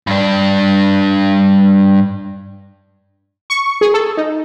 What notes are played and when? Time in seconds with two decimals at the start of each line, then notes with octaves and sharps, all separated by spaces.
0.07 G2 D4
3.50 C#6
3.81 G#4
3.94 A4
4.17 D#4